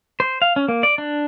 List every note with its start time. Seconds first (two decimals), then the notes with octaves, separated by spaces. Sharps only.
0.20 C5
0.42 F5
0.56 C#4
0.68 A#3
0.83 D5
0.98 D4